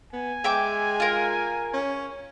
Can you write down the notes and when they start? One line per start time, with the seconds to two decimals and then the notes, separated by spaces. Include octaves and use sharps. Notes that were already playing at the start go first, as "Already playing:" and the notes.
0.13 B3 G#5
0.44 G#3 E5 G5 D6
1.00 F4 A#4
1.73 C#4